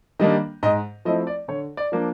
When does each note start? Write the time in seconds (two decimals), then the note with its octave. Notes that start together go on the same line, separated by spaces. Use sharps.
0.19 D#3 G3 A#3 D4 D#5
0.63 G#2 D#5
1.05 F3 A3 C4 E4 D#5
1.27 D5
1.48 D3 C#5
1.77 D5
1.92 F3 A#3 D4